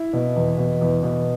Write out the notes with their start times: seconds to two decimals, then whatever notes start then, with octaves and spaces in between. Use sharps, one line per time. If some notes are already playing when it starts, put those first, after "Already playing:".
Already playing: E4
0.13 B2
0.36 E2
0.58 B2
0.81 E2
1.03 B2